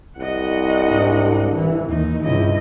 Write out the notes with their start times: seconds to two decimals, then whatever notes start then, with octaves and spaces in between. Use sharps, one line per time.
0.18 C2 D#5 F#5
0.85 G#2 D4
1.56 E3
1.89 D#2 D#4
2.23 C#2 G2 C3 E4 D#5